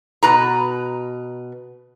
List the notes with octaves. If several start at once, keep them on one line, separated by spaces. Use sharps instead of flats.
B2 B4 A#5